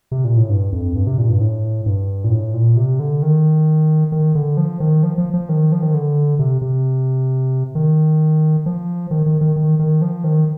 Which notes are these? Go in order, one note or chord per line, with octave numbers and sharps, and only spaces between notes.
C3
A#2
A2
G2
F2
G2
C3
A#2
G2
A2
G2
A#2
A2
A#2
C3
D3
D#3
D#3
D3
F3
D#3
F3
F3
F3
D#3
F3
D#3
D3
C3
C3
D#3
F3
D#3
D#3
D#3
D#3
D#3
F3
D#3